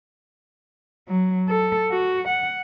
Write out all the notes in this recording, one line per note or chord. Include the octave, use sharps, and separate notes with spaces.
F#3
A4
F#4
F#5